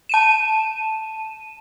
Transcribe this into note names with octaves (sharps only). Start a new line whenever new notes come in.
A5 D#7 E7